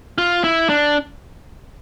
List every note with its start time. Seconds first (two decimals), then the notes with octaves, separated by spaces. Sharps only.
0.18 F4
0.44 E4
0.69 D4